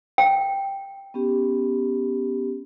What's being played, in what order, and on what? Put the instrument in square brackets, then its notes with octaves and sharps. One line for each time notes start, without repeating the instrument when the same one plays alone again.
[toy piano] G5
[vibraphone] B3 C#4 G4